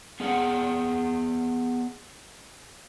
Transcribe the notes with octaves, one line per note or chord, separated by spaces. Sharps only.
B3 G#4 F#5 G5